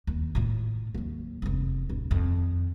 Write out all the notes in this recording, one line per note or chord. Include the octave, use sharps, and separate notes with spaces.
D#2
A2 F4
D#2 F#3
F1 E2
D1
F2 D#3